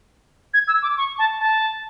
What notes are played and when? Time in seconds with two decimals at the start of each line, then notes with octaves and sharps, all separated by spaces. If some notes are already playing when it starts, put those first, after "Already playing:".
0.54 G#6
0.68 E6
0.83 D6
0.97 C#6
1.19 A5
1.40 A5